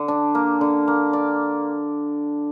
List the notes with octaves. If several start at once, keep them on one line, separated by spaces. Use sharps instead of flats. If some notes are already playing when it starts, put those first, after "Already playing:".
Already playing: D3
D4
A#3
D3
A#3
D5